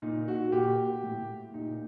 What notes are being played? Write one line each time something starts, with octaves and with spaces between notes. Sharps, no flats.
A#2 D#4
F#4
A#2 G4
A2
A#2 D#4